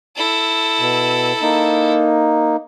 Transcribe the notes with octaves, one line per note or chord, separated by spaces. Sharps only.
E4 A4
B2
A#3 D#4